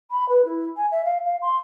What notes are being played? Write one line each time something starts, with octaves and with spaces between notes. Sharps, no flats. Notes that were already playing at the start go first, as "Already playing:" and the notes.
B5
B4
E4
G#5
E5
F5
F5
C6